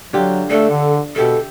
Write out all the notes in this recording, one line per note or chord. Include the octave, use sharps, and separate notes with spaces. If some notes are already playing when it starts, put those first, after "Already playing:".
D3 F#3 F4 G4
A3 D4 A4
D3
B2 G4 A4 E5